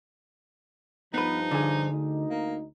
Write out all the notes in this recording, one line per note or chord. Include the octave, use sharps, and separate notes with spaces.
G2 F3 B3 D#4 B4
D3 G#4
D2 D#4
A#3